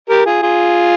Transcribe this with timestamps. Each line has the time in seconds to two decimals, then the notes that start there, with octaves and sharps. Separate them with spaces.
0.10 G4 A#4
0.26 F4 G#4
0.42 F4 G#4